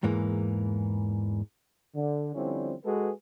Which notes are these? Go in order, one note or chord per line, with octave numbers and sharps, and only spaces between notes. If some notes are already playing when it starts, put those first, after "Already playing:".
E2 G#2 E3 A#3
D3
D3 F3 G3 C4 C#4 E4
G#3 F#4 G#4 A4 B4